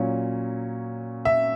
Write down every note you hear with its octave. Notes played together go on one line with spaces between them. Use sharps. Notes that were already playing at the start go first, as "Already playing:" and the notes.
Already playing: A#2 F#3 C#4
E5